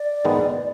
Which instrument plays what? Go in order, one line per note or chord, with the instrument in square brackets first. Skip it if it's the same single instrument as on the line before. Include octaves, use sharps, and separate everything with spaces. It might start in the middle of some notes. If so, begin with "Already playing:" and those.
Already playing: [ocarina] D5
[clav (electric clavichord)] G#2 D#3 G#3 B3